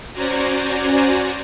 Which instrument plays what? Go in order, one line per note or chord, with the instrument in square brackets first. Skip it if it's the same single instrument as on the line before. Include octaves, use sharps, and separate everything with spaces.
[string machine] C#4 F#4 C5 D5 G#5 A#5